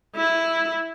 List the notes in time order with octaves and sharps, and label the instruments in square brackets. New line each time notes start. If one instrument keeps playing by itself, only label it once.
[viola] E4